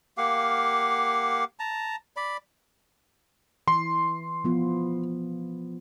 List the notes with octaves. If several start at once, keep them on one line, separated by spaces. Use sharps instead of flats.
A#3 G4 F5 F#5
A5 A#5
D5 B5
E3 C6
F3 B3 F4